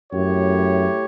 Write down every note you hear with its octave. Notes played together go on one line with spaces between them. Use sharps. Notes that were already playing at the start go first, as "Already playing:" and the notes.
F#2 A3 E4 G4 C#5